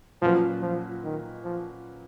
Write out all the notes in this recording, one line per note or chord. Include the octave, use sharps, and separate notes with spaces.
A#2 F3 F#3 C#4 F#4 B4
F3
D#3
F3